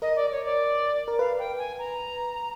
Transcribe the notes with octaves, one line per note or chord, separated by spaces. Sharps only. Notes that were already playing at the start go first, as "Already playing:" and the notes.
A#4 D#5
D5
C#5
D5
A#4
B4 F5
G5
G#5
A#5